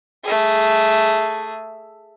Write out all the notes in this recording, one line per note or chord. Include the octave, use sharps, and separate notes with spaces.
A3 G#4